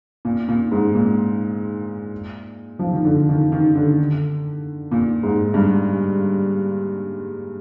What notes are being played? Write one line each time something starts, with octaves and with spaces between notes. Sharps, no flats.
A#2
A#2
G#2
A#2
F3
D#3
D3
D#3
D#3
D3
A#2
G#2
G2